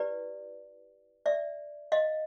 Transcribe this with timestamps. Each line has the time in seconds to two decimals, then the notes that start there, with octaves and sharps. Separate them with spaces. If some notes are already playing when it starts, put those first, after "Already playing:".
Already playing: E4 G4 B4 D5
1.26 D5 E5
1.92 D#5 F5